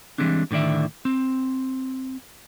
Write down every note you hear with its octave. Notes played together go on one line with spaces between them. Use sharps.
E3 G3 G#3 C4 D4
A2 D3 D#3 D5 E5
C4